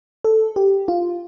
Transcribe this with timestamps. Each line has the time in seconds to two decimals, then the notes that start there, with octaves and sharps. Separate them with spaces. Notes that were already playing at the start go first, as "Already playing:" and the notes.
0.24 A4
0.56 G4
0.88 F4